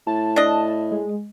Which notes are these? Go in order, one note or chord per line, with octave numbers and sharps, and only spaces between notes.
A2 A5
D4 D#5
G#3